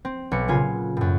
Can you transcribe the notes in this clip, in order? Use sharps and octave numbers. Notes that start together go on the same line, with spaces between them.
C4
B1 C#7
A#2 C#3 F4 G#5
F#2 A2